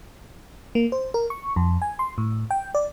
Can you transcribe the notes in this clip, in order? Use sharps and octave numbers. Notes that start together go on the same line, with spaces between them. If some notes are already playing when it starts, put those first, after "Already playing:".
A#3
C5
A#4
C#6
F2
G#5
C6
A2
G5
D5